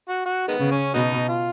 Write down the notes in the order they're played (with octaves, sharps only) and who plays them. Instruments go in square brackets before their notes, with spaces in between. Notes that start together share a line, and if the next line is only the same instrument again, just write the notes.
[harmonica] F#4
F#4
D#3 G#3 B3
[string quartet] C#3
[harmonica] C#4
[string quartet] B2 [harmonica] F#3 B3 D#4
[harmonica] F4